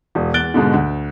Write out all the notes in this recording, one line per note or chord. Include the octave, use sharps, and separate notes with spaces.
E1
E2 F#6 A6 D7 G7
G#2 B2 D3
D2